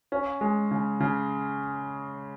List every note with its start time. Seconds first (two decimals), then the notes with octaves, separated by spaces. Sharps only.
0.12 C#4
0.41 G#3
0.71 C#3
1.00 C#3